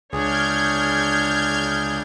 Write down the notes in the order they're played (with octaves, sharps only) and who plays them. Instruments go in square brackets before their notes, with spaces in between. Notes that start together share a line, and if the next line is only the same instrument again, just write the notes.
[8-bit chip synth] C#2 [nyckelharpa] D4 C#5 [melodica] G#4 [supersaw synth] F6 G6 G#6